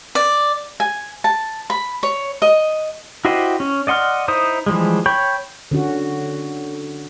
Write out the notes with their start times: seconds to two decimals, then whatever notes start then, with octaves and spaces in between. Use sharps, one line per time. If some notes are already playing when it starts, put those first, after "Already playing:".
0.15 D5
0.80 G#5
1.24 A5
1.70 B5
2.03 C#5
2.42 D#5
3.25 E4 F#4 G4 C5 D#5
3.60 C#4
3.87 D5 D#5 F#5 C6 F6
4.28 D#4 E4 C5 D#6
4.66 E3 F3 G3 G#3
5.06 C#5 G5 B5 C#6 G6
5.71 D3 C#4 F#4